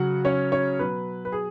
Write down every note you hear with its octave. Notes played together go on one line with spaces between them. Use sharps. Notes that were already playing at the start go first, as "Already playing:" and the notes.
Already playing: C#3 F#3 F#4 F#5
C#4 C#5
C#4 C#5
B2 F#3 B4
B4
G#4